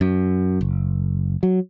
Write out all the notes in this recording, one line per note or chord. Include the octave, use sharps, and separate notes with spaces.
F#2
F#1
F#3